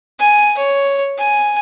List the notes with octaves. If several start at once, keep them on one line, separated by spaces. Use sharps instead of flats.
G#5
C#5
G#5